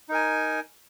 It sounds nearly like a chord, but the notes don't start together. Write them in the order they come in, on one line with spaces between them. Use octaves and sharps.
D#4 A#4 G#5